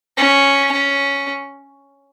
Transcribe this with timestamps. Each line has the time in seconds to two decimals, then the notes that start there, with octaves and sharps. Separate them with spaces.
0.17 C#4
0.72 C#4